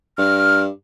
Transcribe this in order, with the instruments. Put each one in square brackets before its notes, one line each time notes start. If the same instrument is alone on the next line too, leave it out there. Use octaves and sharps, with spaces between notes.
[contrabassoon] G2 [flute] F6